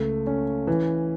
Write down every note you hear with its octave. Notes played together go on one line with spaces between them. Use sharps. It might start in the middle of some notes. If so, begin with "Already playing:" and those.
Already playing: C#2 A3
C#4
E3